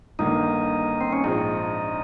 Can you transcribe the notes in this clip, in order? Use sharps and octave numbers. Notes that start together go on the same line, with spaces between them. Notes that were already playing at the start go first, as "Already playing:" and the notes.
G1 G2 D#3 A#3 D#4
C4
C#4
A#1 G#2 F3 C4 D#4